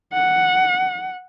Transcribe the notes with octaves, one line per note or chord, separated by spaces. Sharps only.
F#5